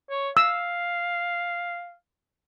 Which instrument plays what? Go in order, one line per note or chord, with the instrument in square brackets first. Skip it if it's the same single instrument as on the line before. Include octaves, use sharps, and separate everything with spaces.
[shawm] C#5
[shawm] F5 [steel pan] E6